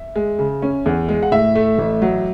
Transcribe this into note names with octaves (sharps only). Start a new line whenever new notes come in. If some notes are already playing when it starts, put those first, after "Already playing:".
Already playing: E5
G#3
C#3
C#4
E2
G#3
F#5
A2 E5
A3
A1
F#3